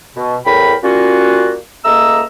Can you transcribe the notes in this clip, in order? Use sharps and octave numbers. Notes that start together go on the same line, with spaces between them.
B2
E2 A2 A#4 G5 B5
G3 A#3 C#4 F4 F#4
C#2 A3 A#3 D#5 A#5 E6